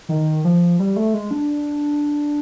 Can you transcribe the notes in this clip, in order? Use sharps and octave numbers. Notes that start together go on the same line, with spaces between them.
D#3
F3
G3
A3
G#3
D4